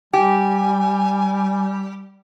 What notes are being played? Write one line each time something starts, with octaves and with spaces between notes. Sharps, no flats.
G3 G4 G#5